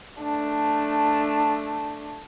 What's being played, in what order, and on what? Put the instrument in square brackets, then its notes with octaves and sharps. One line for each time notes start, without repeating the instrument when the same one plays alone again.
[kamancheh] A3 D4